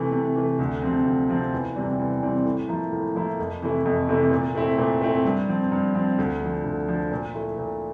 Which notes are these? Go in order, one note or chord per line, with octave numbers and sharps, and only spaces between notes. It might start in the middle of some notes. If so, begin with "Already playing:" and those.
Already playing: C3 E3 A3
C3
E3 A3
D2
C3 F3 C4
D2
C3 F3 C4
E2
C3 E3 G3 C4
E2
C3 E3 G3 C4
A2
F3 A#3 E4
A2
F3 A#3 E4
F2
C3 E3 A3 E4
F2
C3 E3 A3 E4
A#2
A3 C4 E4
A#2
A3 C4 E4
G2
F3 C4
G2
F3 C4
D2
D3 F3
D2
D3 F3
A#2
A3 E4
A#2